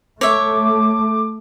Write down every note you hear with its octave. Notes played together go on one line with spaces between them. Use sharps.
A3 C#5 E5 D6